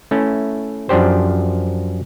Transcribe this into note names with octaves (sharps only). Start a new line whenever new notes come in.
A3 C#4 E4
F#2 F3 D4 G4 C5